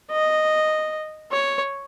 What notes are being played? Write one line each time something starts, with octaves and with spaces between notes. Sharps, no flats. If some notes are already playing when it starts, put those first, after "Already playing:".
D#5
C#5